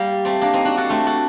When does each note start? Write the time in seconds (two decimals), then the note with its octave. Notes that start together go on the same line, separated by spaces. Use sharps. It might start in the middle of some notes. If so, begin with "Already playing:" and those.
Already playing: G3 A#3
0.25 A3 C4
0.41 A#3 D4
0.53 C4 D#4
0.65 D4 F#4
0.77 F#4 A4
0.90 A3 C4
1.07 F#4 A4